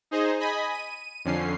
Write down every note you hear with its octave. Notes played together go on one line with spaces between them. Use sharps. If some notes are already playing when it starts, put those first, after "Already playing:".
D#4 G#4 C5 D#5
D#5 G#5 B5 D#6
D#7
F2 D3 C#4 C7